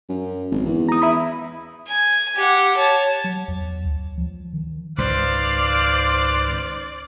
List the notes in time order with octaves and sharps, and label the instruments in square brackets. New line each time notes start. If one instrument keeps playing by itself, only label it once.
[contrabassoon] F#2
G#1
E2
[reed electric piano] A#5 D#6
E5 B5
[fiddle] G#5
G4 F#5
C#5 A5
[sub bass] F#3
E2
D2
F3
D#3
[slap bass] C#2 G#2 D#3 [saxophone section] B4 C5 [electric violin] D5 [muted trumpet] F5